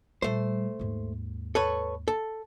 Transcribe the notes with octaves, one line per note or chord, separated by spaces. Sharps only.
A#2 G3 A3 C5
D#2 G#2
A4 B4 C#5
A4